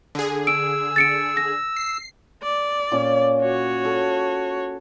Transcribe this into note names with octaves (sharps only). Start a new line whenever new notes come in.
D3 G#4
E6 D7
A6 C#7 D7
A#6
C7
D5
A#2 C#4 D6
F#4 C#5
A4